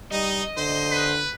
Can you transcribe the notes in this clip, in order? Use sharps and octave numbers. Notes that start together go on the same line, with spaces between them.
G3 D#4 D#5
D3 C5
B4